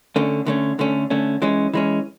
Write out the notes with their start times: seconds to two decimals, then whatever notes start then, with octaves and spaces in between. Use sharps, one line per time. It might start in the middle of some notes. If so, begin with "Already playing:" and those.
0.16 D3 A3 C#4
0.46 D3 A3 C#4
0.79 D3 A3 C#4
1.10 D3 A3 C#4
1.42 E3 G#3 C#4
1.74 E3 G#3 C#4